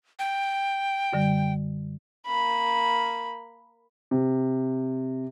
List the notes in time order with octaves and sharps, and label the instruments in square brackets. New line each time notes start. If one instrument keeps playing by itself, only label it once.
[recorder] G5
[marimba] F#2 D3 G3
[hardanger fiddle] A#3 B5
[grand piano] C3